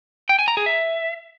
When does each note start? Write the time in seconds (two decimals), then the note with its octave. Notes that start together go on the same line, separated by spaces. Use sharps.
0.29 G5
0.39 G#5
0.48 A#5
0.57 G#4
0.66 E5